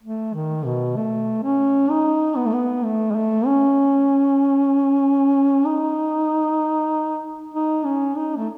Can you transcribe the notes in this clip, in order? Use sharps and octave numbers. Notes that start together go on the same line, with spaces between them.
A3
D#3
B2
A3
C#4
D#4
B3
A3
B3
A3
G#3
A3
C#4
D#4
D#4
C#4
D#4
A3